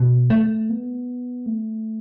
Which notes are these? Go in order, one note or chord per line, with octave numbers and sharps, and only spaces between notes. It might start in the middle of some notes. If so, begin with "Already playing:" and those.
Already playing: B2
A3
B3
A3